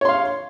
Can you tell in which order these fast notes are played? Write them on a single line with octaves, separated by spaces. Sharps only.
C#5 C6 F5